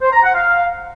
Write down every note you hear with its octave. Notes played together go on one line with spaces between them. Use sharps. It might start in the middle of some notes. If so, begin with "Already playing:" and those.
C5
A#5
F#5
F5